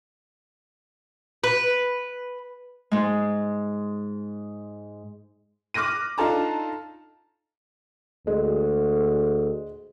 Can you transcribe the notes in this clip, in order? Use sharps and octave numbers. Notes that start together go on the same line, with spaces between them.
B4
G#2 G#3
D6 F6 F#6 A#6 D#7
D4 D#4 F4 A4 A5 A#5
D2 G#3